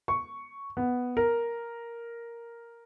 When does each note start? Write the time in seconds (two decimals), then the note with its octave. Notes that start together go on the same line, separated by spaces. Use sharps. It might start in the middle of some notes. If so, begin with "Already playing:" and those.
0.08 C#6
0.77 B3
1.17 A#4